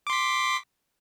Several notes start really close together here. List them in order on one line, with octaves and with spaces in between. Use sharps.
D6 C6 B6